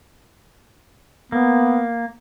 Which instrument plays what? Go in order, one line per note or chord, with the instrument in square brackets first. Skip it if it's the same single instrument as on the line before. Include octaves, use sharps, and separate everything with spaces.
[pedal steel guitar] A#3 [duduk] B3